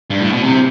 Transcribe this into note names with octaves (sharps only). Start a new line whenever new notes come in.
G2
A2
B2
C3